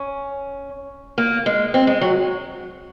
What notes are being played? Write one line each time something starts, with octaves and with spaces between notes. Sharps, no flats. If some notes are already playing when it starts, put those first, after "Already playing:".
Already playing: C#4
A#3
G#3
C4
G#3
F#3